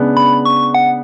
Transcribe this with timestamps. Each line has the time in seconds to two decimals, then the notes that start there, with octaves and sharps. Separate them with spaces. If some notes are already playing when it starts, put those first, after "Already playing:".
Already playing: C#3 G#3 B3 D4
0.17 B5
0.45 C#6
0.74 F#5